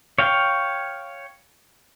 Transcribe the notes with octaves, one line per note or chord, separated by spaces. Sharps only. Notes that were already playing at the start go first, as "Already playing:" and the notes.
C#5 F5 G5